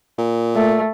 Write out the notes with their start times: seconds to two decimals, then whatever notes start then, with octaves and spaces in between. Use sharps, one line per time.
0.19 A#2
0.55 A3